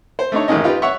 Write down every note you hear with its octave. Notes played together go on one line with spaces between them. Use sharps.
C5
A3 D4 D#4 C#5
A1 F#2 D#3 G#3 C#4 D#5
D#4 F4 G4 B4
C#5 E5 F#5 C#6